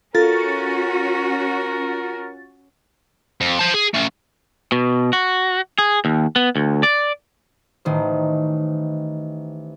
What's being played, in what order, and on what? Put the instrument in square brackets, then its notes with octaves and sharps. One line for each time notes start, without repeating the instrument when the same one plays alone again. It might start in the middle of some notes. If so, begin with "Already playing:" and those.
[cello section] C#4 F#4 [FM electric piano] F4 A6 [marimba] A4 [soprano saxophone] A#4
[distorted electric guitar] F2
C5 A5
G#4
A3 C#4
[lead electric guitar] B2
F#4
G#4
D#2
B3
D2
D5
[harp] A1 D#3 C5